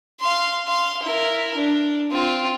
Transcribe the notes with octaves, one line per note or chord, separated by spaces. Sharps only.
F5 C6
F5 C6
E4 A#4
D4
C4 F4